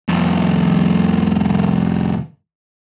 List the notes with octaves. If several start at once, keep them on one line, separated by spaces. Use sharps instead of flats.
C2 F2